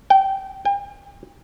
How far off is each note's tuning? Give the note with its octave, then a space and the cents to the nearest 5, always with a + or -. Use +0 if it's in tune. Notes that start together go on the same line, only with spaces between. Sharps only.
G5 -20
G5 +40